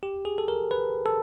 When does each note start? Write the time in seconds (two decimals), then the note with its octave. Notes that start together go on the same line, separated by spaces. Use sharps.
0.03 G4
0.25 G#4
0.38 A4
0.48 A#4
0.71 B4
1.06 A4